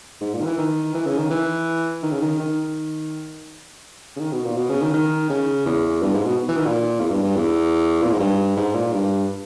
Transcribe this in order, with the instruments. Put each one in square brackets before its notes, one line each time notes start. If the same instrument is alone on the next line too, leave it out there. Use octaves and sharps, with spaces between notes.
[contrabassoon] G#2
A#2
D#3
E3
D#3
E3
C#3
D#3
E3
D#3
C#3
D#3
D#3
C#3
D#3
B2
A#2
B2
C#3
D#3
D#3
C#3
E2
G2
G#2
B2
E3
D#3
A#2
E2
G2
G2
E2
A#2
G#2
G2
G#2
A#2
G2